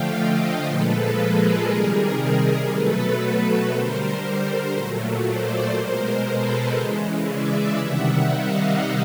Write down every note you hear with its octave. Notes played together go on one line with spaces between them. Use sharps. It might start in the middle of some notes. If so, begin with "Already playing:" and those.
Already playing: D3 F3 A3 F5 G5
D#5 F5
A#2 F3 G#3 A4 B4
G#4 A#4
C3 D#3 G3 G#4 A#4
G#4 A#4
B2 F#3 A3 A4 B4
A4 B4
D3 G3 A#4 C5
A#2 F#3 A3
C5 D5
B2 G#3 A#4 C5
A4 B4
C#3 E3 G#3
D5 E5
C3 D#3 G3 E5 F#5
D#5 F5